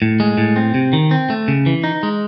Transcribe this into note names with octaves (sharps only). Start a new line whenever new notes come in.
A2
G#3
A2
C4
C3
D#3
C4
A3
C#3
E3
D#4
G#3